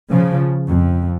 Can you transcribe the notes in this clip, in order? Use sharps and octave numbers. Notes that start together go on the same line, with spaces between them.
C#3 F3
F2